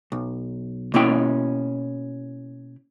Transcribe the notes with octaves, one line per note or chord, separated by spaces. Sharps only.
B1
B2 A#3 C#4 E4 G5